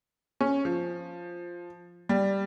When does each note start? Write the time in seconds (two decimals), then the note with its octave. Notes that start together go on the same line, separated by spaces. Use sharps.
0.41 C#4
0.65 F3
2.09 G3